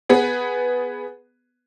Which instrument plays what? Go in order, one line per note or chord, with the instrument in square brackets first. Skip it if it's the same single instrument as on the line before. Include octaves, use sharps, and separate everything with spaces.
[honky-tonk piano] B3 G#4 B4